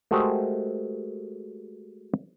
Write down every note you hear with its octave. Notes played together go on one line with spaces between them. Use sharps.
G#3 A3 F#4 G4 A#4 C5